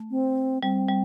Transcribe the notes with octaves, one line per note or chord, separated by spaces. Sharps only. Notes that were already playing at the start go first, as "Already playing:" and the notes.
Already playing: A3
C4
G3 C4
G3